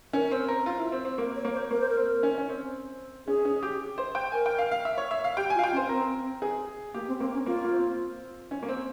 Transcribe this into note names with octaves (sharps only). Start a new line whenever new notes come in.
C#4 A#4
C4
A#4
F4
E4
C4
C4
A#3 A#4
C#5
A#3
C5
A#3 A#4
C5
A#4
C4
C#4
C#4
C4
C#4 G#4
C#4
G4
C5
G5
A#4 G#5
G5
F5
F5
E5
C#5
E5
F5
G4 G5
F4 G#5
F5
G5
C#4
C5
C4 A#4
G#4
A#3 G4
C4
A#3 C4
C#4
A#3 F4
A#3
C4
C#4
A#3
C4